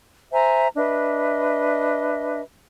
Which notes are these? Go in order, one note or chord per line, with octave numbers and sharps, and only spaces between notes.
C5 E5 G#5 A#5
D4 B4 D#5 E5